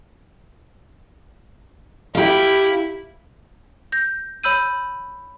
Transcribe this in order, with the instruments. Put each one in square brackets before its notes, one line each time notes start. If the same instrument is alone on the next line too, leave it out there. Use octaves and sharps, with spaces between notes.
[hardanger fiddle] E4 [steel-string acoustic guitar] G4 F5
[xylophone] G6 A#6
C#5 B5 E6 G6 D#7